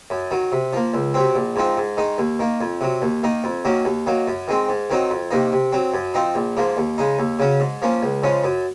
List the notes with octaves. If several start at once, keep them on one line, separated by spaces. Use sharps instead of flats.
F#2
D#3 F#3
C3
F3 A#3
C#2
C3 F#3 C4
A#1
G#2 F3 C4 D#4
G#2
D#3 G#3 D#4
D#2
D#3 A#3
F2
C3 F#3
D#2
D#3 A#3 D#4
F2
D#3 F#3 A#3 C#4
D#2
D#3 F#3 A#3
F#2
D#3 G#3 C4
G#2
D#3 F#3 C4 D#4
F2
C3 D#3 A#3 D#4
C3
F#3 C4
F#2
F3 C4 D#4
A#1
G#2 F3 A#3
D#2
C#3 G#3 D#4
D#2
C#3 F#3 C#4
G#2
F3 A#3 C#4
C#2
C#3 F3 G#3 C#4
F#2